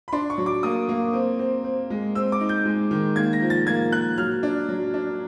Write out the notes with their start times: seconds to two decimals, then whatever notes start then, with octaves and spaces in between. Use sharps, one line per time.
0.08 B5
0.12 D4 C6
0.30 C#6
0.38 F#3
0.46 D6
0.63 A#3 D#6
0.89 A#3
1.13 C4
1.39 C4
1.64 C4
1.90 G#3
2.15 C4 E6
2.32 D6
2.40 D#4
2.49 G6
2.66 G#3
2.91 D#3
3.16 A#3 G#6
3.33 A#6
3.41 F3
3.50 A6
3.67 A#3 G#6
3.92 A#3 F#6
4.18 F#3 F6
4.43 D4
4.69 F#3
4.94 D4